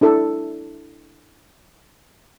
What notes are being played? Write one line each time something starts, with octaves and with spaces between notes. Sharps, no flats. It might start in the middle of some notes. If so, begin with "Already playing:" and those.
D4 E4 A4 D5